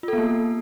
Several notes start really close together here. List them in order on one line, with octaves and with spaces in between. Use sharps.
F4 A4 B3 A#3